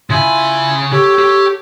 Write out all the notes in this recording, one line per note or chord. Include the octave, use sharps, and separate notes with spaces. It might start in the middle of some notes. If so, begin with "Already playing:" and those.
C#3 E4 F4 G#5 B5
G4 A4 C#5
G4